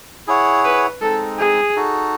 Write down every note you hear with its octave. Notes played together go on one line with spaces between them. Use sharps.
E4 G#4 C#5 F#5
B4
G#3 C4 D#4 A4
G#4
D#4 F#4 A4